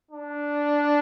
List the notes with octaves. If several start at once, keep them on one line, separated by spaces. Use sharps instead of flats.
D4